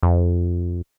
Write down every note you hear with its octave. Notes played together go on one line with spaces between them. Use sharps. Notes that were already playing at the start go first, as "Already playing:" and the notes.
F2